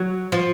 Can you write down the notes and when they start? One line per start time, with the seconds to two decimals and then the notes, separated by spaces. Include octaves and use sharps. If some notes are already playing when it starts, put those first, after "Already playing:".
Already playing: F#3
0.32 F3